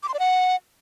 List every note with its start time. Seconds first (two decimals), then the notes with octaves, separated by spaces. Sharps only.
0.03 D6
0.08 C6
0.14 D5
0.19 F#5